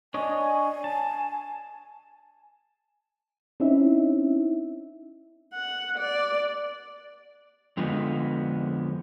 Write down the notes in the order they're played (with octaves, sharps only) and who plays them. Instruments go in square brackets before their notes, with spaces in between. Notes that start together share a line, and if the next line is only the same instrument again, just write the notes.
[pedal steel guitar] D4 C#5 D#5 [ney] G#5
[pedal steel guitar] A5
[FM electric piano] C4 C#4 D#4 E4 E5
[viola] F#5
D5
[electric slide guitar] F2 D3 F3 G#3 B3